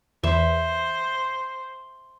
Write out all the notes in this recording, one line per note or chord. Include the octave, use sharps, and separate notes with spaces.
E2 C5 E5